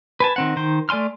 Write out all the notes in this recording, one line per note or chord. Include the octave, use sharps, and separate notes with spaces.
B4 G#5 A5
D#3 C4 F#5
D#3 C5
A3 D5 G#5 C6 F6